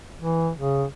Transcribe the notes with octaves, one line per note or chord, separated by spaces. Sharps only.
E3
C#3